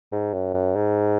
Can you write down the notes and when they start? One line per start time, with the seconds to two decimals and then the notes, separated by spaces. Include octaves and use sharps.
0.12 G#2
0.34 F#2
0.54 F#2
0.75 G#2